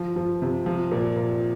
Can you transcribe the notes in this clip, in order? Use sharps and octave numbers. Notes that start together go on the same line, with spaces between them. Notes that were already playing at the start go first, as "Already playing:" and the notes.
Already playing: F3
F3
C3
F3
A#2
A#2